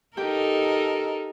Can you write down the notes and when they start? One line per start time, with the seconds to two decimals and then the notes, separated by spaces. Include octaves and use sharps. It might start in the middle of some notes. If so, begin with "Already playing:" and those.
0.17 D#4 G4 A4 A#4 G5